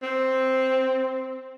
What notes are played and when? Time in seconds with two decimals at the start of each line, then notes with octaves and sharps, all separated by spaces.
0.03 C4